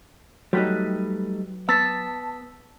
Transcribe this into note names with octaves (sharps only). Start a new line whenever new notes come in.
F#3 G3 A3 D#4 B4
B3 A5 E6 B6